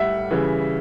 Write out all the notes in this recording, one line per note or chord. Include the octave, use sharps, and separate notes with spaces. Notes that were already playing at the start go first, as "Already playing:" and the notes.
Already playing: A2 G3 E5 F#5
C#3 E3 G3